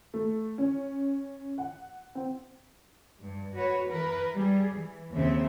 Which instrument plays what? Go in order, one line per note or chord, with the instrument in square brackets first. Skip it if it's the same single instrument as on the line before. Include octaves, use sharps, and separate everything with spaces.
[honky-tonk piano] A3
C#4
F#5
C4
[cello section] G2
F#4 B4 C#5
E3 A#4 B4
G3 G#4
E3
D#2 C#3 F3 C4 E5